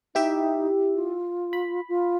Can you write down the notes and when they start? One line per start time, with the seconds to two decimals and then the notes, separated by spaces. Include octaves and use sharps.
0.15 D#4 E4 G4 E5
0.95 F4
1.53 B5
1.89 F4